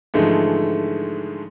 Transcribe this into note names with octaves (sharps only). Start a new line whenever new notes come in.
G#2 D3 E3 F3 G#3 A3